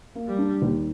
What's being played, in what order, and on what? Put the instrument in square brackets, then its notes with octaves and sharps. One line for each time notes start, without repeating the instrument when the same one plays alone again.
[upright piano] A#3
[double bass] G3
[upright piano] D4
D#2